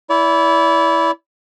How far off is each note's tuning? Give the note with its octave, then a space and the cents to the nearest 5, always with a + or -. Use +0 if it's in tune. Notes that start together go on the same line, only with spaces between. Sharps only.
E4 +0 D5 -40